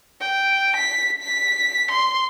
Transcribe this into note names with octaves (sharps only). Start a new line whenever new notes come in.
G5
B6
B6
C6